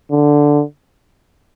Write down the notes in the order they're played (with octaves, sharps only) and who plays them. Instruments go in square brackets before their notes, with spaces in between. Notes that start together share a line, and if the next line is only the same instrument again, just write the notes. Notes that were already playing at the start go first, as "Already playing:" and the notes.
[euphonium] D3